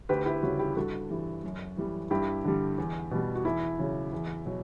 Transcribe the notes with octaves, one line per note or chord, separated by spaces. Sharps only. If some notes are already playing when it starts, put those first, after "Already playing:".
D2 G4 B4
E4 G4
C#3 G3 F#4
E4 G4
G2 F#4 A4
E3 G3
F#2
E3 G3
G2 E4 G4
D3 G3
E2
B2 G3
F#4
E2 E4
C#3 F#3
E2
B2 F#3